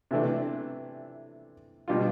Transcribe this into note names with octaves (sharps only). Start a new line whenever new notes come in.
C3 E3 A3 D4
B2 G3 D4 F4